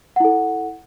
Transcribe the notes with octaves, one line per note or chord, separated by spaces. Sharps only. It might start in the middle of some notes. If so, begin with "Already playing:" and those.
E4 A4 F#5